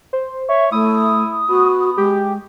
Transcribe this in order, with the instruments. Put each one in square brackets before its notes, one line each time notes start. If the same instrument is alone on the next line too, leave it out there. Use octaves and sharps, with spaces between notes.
[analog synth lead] C5
[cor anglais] C#5 [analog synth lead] E5
[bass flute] A3 [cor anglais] E4 [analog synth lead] D#6
[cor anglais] B3 [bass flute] F#4
[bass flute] G#3 [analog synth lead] G4